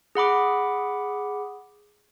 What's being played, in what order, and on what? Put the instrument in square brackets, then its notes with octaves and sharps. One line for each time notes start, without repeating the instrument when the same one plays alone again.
[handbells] G#4 F#5 B5 D6